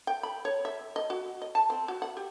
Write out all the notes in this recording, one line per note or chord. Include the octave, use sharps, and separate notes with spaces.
G5
B5
C#5
E5
D#5
F#4
D#5
A5
C4
F#4
F#5
G4